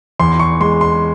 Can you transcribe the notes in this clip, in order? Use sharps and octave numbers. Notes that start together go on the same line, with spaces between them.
E2 C6
C#6
G#3 C6
C6